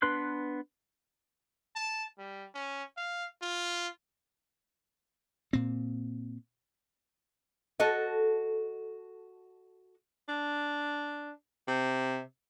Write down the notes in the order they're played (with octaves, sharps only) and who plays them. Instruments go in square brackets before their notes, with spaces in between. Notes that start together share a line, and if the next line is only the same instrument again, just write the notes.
[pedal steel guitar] B3 D4 B4 C6 F#6
[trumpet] A5
G3
C#4
F5
F4
[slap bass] A#2 C4
[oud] F#4 A4 D#5
[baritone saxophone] D4
C3